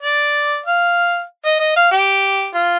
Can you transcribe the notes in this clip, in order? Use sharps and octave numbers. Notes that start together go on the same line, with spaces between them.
D5
F5
D#5
D#5
F5
G4
F4